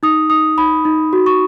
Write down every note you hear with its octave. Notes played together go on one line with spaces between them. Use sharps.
D#4 D#6
D#4 D#6
D#4 B5
D#4
F#4
C#6